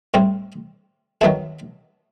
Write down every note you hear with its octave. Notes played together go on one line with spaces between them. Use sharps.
A2 G3 C4
D#3 F#3 B3 E4 A4